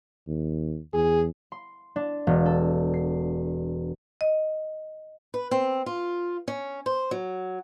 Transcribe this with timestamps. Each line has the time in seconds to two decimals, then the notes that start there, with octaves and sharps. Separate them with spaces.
0.27 D#2
0.93 E2 G#4
1.52 C6
1.96 D4
2.27 E1
2.46 A4
2.94 C7
4.21 D#5
5.34 B4
5.51 C4
5.86 F4
6.48 C#4
6.86 C5
7.11 F#3